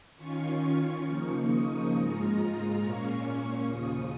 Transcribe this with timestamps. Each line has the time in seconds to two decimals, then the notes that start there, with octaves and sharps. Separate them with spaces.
0.16 D#3 C#4 F4 C#6
1.04 C#3 F3 A#3 D#4
1.48 D#6
1.92 G#2 G#3 F4 A#5
2.80 A#2 A#3 C#4 C#6
3.67 D#2 C#3 F3 D#6